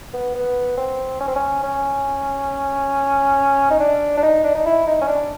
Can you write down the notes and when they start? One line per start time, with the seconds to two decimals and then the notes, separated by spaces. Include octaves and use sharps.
0.13 B3
0.35 B3
0.77 C4
1.20 C#4
1.28 C4
1.36 C#4
1.63 C#4
3.70 D#4
3.79 D4
4.17 D4
4.22 D#4
4.44 D4
4.55 D#4
4.65 E4
4.87 D#4
5.01 C#4
5.08 D4